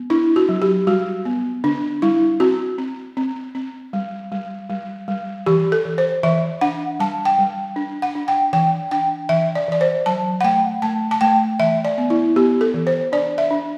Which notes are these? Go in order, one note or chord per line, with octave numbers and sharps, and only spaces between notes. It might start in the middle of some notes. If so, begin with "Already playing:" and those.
Already playing: B3
D4 E4
F#4
F#3
G4
G3 F#4
B3
D3 D4
G3 E4
C4 F#4
C4
C4
C4
G3
G3
G3
G3
E3 G4
A4
E3
C5
E3 E5
D4 F#5
G3 A5
G5
G3
D4
F#5
D4
G5
E3 G5
D4 G5
E3 E5
D5
E3 D5
C5
F#3 A5
F#5
A3 G5
A3 A5
A5
A3 G5
E3 E5
D5
B3
E4
B3 G4
A4
E3
C5
D4 D5
E5
D4